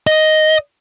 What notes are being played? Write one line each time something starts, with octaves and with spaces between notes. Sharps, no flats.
D#5